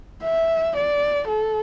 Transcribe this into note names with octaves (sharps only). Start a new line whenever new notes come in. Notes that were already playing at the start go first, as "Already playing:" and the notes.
E5
D5
A4